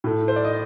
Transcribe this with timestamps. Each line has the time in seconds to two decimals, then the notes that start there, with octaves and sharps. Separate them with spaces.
0.04 A2 A3
0.28 C5
0.36 D5
0.45 D#5